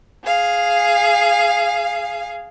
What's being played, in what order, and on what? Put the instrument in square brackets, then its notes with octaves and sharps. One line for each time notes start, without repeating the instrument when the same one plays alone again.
[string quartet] G#4 F5